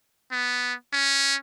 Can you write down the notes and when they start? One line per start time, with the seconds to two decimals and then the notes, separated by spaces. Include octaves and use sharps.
0.32 B3
0.93 C#4